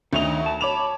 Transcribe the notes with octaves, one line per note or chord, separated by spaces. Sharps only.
D2 D#3 C#5 D#5 F7
A5
C#5 A5 B5 D6 F7